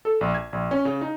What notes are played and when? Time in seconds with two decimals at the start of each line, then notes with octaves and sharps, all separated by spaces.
0.05 A4
0.21 A#1
0.34 G#6
0.53 A#1
0.71 C#4
0.85 C#3
1.01 D#4